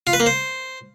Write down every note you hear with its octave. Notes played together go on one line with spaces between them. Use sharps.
F4
B4
A#3
C5